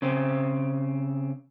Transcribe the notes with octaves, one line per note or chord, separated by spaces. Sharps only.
C#3 C4